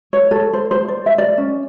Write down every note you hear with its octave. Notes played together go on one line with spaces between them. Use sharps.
C#5
A4
C5
C5
D5
E5
D5
C#4